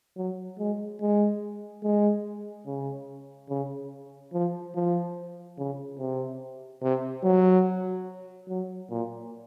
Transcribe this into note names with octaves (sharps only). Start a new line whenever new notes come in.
F#3
G#3
G#3
G#3
C#3
C#3
F3
F3
C#3
C3
C3
F#3
F#3
A#2